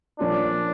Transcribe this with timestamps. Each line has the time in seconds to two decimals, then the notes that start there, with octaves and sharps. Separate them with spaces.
0.20 A#2 F3 A#3 C#4 D4 F4